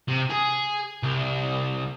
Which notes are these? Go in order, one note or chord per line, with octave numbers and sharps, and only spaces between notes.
C3
G#4
C2